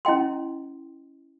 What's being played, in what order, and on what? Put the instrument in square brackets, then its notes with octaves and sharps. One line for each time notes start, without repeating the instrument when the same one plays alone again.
[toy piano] C#4 E4 D#5 G5 C6